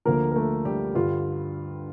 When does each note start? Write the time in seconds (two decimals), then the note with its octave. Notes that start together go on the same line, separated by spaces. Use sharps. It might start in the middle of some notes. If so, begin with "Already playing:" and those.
0.05 D2 D3 F3 A#3 A#4
0.31 A#4
0.36 A3 A4
0.65 G3 G4
0.95 G2 D3 G3 F4